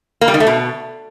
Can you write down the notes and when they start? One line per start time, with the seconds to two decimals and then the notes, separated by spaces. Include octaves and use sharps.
0.21 A#3
0.28 G3
0.34 D#3
0.40 A3
0.47 B2